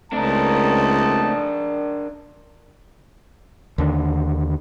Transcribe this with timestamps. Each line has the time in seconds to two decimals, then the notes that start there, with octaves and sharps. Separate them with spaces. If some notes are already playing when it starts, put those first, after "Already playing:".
0.13 C#2 A3 C4 D4 D#4 A#4 A5
3.78 D#2 D3